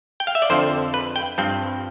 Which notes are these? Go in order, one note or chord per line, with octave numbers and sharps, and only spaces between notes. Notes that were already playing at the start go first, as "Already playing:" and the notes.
G5
F5
E5
D5
F2 D3 F3 C5
B4
G5
G2 F3 C4